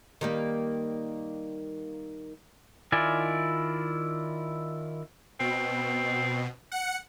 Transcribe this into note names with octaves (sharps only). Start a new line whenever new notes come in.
D#3 G3 A#3
D#3 E4 F4 D5 G#5
B2 C4
F#5 C#7